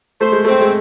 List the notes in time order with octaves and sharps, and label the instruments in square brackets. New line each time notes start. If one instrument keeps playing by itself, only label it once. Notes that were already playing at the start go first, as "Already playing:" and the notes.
[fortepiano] A3 [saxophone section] C5
[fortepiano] G#3
[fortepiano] A3 [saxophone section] C4
[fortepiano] G#3